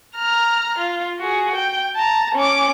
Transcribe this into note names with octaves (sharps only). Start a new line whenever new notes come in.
A#5 F6
F4
F#4 G#4
G5
A5 A#5
C#4 D6